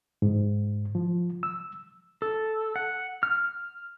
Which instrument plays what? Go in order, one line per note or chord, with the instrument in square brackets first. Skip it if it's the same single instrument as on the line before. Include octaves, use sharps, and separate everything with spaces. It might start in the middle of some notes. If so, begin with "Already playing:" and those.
[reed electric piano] G#2
F3
E6
[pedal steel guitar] A4
F#5
F6